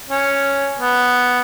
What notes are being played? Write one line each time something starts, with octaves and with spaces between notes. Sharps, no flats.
C#4
B3